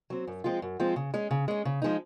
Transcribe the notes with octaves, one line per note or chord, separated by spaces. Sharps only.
F#3 C4
F#2
F3 G#3 C4 F4
F#2
F3 G#3 C4 F4
C#3
G#3 C#4
C#3
G#3 C#4
C#3
F3 G#3 D#4